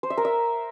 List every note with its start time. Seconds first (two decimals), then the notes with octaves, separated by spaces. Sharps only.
0.03 C5
0.10 E5
0.17 A#4
0.25 E5